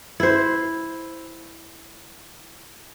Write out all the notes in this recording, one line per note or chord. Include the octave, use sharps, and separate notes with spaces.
E4 C5